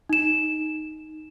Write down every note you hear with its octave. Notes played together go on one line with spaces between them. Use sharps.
D#4 E7